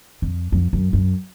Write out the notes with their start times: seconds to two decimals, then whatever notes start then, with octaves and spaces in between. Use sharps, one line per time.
0.22 F2
0.52 F2
0.73 F#2
0.93 F#2